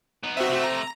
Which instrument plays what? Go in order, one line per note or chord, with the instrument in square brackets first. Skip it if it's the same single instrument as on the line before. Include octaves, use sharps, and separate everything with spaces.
[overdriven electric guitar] B3 D#4
[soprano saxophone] C4 [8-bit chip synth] F#4 E5
[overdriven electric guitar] C3 A3
[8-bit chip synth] A#5